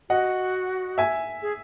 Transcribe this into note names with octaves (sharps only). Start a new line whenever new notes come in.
F#4 D#5 F#5
E5 G#5
G#4